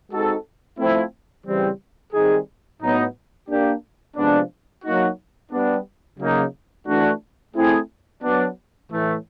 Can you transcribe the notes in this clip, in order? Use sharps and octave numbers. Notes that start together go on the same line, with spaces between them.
G#3 C4 D#4 F#4 A4
F3 A3 C4 E4
C#3 E3 G3 C4
D#3 G3 C4 D#4 G#4
A2 F#3 B3 D#4
A#3 D4 G4
C3 F3 G#3 B3 D4
F#3 A#3 D#4 F#4
G3 B3 D4
C#3 F#3 A#3 D#4
E3 A3 D4 F#4
A3 C4 E4 G#4
F#3 B3 D4
A2 E3 A3